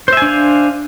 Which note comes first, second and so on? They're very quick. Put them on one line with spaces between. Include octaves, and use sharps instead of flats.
C5 E5 G#5 D4 F5